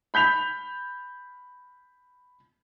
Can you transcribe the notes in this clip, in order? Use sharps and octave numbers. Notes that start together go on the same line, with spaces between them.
B5 G6 B6 F7